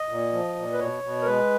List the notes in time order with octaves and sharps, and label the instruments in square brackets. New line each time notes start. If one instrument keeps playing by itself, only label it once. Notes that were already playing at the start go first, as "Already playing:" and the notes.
Already playing: [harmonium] D#5
A#2
F3
A#2
B4
B2 C#5
B2
A#4
G#3 B4